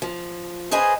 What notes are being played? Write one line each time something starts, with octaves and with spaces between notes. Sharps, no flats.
F3
G#4 B4 C5 D#5 G#5